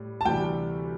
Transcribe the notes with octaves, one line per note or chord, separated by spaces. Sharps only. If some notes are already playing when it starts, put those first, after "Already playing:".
Already playing: A2 G3
A5
D2 C3 E3 G3 G5